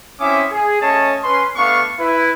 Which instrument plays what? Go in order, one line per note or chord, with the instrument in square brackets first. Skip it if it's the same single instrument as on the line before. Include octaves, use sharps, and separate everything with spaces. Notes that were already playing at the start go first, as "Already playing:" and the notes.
[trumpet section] C4 C#4 E4 E5 D6 D#6
G#4
A3 C#4 C#5 D#5 A5
C#4 B4 C6
A3 B3 D4 F5 C#6
E4 B4